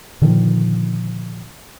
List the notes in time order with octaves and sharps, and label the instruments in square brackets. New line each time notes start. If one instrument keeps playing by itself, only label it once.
[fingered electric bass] A#2 D3 D#3 F3